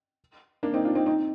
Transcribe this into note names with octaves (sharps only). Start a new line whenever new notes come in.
A#3 D4
C4 D#4
D4 F4
C4 D#4
C4 D#4